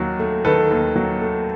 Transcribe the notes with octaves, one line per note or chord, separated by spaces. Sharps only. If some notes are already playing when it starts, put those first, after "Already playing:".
Already playing: D#2 D#3 F#3
A3
D#3 A4 B4
D#2
F#3
A3